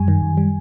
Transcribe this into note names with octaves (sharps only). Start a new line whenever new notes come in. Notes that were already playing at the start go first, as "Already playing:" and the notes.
Already playing: F#2 G3 G#5
D#3
F#2
G3